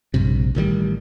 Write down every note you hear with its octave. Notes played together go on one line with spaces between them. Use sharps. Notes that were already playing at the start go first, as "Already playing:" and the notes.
A#1 G2 C3
A1 D#3 E3 G3